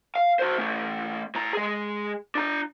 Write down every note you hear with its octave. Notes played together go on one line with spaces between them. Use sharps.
F5
F#4 C5
A3 C#4
A2 A#5
G#3 G#4
D4 A#5